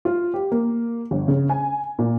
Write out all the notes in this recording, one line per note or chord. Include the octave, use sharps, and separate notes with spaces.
F4
G4
A#3
G1
C#3
G#5
A#2